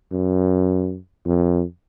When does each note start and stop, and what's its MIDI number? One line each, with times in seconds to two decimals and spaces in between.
0.12 0.98 42
1.26 1.64 41